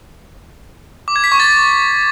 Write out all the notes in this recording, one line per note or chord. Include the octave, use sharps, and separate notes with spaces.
D6
G#6
B6
C#6
A6